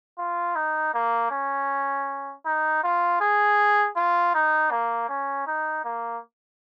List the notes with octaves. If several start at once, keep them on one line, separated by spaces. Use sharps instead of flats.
F4
D#4
A#3
C#4
D#4
F4
G#4
F4
D#4
A#3
C#4
D#4
A#3